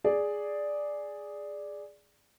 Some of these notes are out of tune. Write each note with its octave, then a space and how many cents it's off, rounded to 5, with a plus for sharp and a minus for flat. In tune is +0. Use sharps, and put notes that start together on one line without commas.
G#4 +0 D5 +0